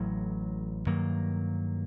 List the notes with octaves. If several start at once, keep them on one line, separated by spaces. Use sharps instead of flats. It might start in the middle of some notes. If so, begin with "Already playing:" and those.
Already playing: A1 A2 F#3
G2 D#3 F#3 A#3